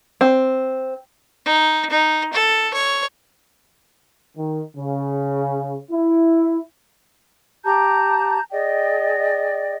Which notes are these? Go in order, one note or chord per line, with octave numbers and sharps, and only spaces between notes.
C4
D#4
D#4
A4
C#5
D#3
C#3
E4
G4 A5 A#5 G6
G#4 D5 D#5 G5